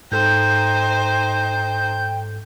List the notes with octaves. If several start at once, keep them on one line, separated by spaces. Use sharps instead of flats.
G#2 D#4 A4 C5 G5 G6